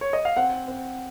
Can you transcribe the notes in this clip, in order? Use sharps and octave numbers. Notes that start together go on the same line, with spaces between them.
C#5
D#5
F5
C4 F#5
C4